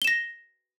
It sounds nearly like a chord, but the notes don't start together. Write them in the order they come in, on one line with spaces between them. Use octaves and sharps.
G7 E7 A#6